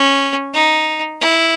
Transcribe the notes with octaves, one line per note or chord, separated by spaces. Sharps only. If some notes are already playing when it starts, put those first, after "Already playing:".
Already playing: C#4
D#4
E4